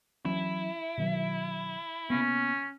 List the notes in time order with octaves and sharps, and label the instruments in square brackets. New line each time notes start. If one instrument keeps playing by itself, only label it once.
[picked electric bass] E3 F#3 C#4 [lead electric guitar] E4
[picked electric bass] B2 D#3 F#3
[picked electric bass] C3 A#3 B3 [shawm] C#4